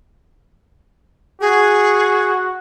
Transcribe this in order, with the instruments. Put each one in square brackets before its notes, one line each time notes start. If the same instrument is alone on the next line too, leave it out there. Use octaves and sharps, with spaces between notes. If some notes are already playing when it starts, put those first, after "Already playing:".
[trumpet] F#4 [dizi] G#4